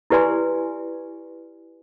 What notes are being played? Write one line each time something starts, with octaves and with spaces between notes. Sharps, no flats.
E4 G4 B4 D5 G#5 C6